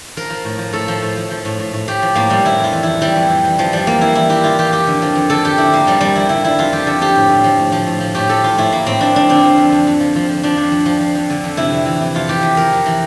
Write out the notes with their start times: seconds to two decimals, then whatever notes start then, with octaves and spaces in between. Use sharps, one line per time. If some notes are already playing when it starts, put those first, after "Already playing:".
0.16 F3 A#4
0.30 F3
0.45 A2
0.58 F3
0.73 A2 A4
0.88 F3
1.02 A2
1.17 F3
1.31 F3
1.45 A2
1.59 A2
1.73 A2
1.88 A2 G4
2.02 F3
2.15 A2 A#3
2.30 A2 G3
2.45 F2 E4
2.59 F2 F4
2.73 E3
2.83 F2 E4
3.01 E3 G3
3.16 F2
3.29 F2
3.44 E3
3.58 F2 F3
3.72 F2 G3
3.87 E3 A#3
4.01 E3 E4
4.15 E3 E4
4.29 E3 G4
4.44 E3 F4
4.58 E3 G4
4.73 F2 G4
4.87 D3
5.02 F3
5.15 F2
5.30 D3 A4
5.44 F2 G4
5.58 F2 E4
5.73 F2 A#3
5.87 F3 G3
6.01 F2 G3
6.15 F2 E4
6.29 D3 E4
6.44 F3 E4
6.59 F2 F4
6.73 F2 G4
6.86 D3 A4
7.01 F3 G4
7.15 A2
7.29 A2
7.44 F3
7.59 A2
7.72 F3
7.87 A2
8.00 F3
8.15 A2 G4
8.29 F3 A4
8.44 F3 F4
8.58 A2 E4
8.72 A2 A#3
8.86 A2 C4
9.01 F3 D4
9.15 F3 D4
9.29 D3 C4
9.44 F3
9.57 F2
9.72 F2
9.87 F2
10.00 F3
10.16 F3
10.29 F3
10.43 F3 D4
10.57 F2
10.72 F2
10.86 F3
11.00 F3
11.15 F2
11.30 D3
11.44 F2
11.57 C3 E4
11.72 F2
11.86 E3
12.00 C3
12.15 F2 F4
12.28 E3 G4
12.43 F2
12.57 F2 A#4
12.72 F2
12.86 E3